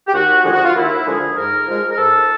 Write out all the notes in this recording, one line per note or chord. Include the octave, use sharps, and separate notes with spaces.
G4
D#2 F#4
D3 F3 G#3
F#4
F4
D#2 E4
D3 F3 G#3 G#4
G#2 A#4
F3 G#3
A#4
G#2 A4